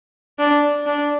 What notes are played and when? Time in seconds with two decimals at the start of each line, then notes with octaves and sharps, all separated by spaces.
0.39 D4
0.86 D4